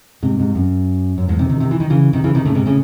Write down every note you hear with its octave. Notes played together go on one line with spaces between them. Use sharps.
G#2 C3
G#2 C3
F#2
F#2
E2 G#2
C3 D#3
C3 D#3
C3 D#3
E3
D#3
C#3 E3
C3 D#3
C#3 E3
C3 D#3
A2 C#3
G#2 C3
A2 C#3